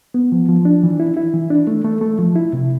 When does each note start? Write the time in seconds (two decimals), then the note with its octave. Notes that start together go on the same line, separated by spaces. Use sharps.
0.14 B3
0.32 F3
0.49 F3
0.65 D4
0.83 E3
1.00 E4
1.17 E4
1.34 E3
1.50 D4
1.67 A3
1.85 A3
2.01 A3
2.19 F3
2.36 E4
2.53 C3